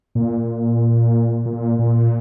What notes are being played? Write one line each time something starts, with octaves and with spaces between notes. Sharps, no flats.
A#2
A#2
A#2